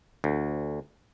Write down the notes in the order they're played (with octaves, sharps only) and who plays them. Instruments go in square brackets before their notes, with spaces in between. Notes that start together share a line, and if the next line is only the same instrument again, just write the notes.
[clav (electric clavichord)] D2